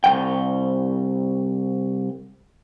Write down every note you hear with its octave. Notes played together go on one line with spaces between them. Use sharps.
C2 C#3 G5